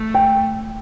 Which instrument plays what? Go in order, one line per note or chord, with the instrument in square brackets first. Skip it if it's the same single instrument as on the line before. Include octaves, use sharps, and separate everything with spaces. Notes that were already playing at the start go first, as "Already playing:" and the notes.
Already playing: [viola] A3
[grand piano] G5